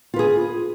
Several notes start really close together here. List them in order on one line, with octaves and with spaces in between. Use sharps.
F4 B4 G#4